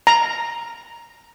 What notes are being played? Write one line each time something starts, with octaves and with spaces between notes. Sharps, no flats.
A#5